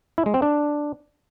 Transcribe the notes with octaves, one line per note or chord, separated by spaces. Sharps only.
E4
G#3
C4
D4